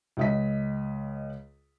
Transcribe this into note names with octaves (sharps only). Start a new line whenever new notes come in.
C#2 D#5 B6